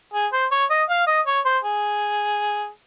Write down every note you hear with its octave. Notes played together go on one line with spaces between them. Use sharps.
G#4
C5
C#5
D#5
F5
D#5
C#5
C5
G#4